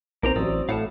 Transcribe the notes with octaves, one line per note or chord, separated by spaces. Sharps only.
B1 A#3 C4 G4 A#4 C5 A#5
A1 F#3 C4 D5 D#6 E6
A2 F5 F#5 A5